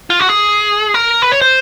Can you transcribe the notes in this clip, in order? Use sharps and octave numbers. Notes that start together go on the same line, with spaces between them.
F4
F#4
G#4
A#4
B4
C#5
C5